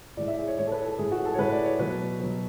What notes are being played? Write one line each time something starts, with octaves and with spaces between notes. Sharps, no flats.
A2 E3 G#3 D5
E5
G#4
C#5
A2 E3 G#3 C#5
A4
B4
A4
A2 G#3 G#4
F#4
A4
C#5
A2 G#3 B4
D5
C#5
B2 F#3 B4
B2 F#3